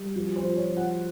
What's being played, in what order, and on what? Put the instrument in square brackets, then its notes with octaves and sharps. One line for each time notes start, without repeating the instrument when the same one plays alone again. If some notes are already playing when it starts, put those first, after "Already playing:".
Already playing: [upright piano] G3
F3 F#4
C5
F3
C#5
F3
F#5